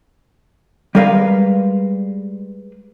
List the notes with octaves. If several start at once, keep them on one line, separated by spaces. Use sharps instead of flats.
G3 G#3 A#4 B4 F5